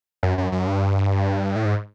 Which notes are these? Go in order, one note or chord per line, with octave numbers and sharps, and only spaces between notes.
F#2
F#2
F#2
G2
A2
G#2